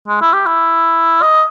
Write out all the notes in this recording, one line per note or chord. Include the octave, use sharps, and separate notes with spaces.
G#3
E4
G4
E4
D#5